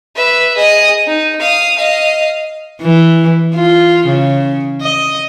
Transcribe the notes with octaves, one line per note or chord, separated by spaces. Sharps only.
B4 E5
G#4 D#5
D#4
F5 D#6
D#5 F5
E3
F4
C#3
D#5